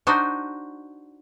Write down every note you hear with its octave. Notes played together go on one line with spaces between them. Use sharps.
D4 D#4 F#4 C5